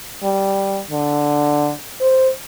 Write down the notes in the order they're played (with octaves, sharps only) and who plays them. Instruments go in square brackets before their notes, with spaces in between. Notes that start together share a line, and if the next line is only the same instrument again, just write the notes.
[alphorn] G3
D3
C5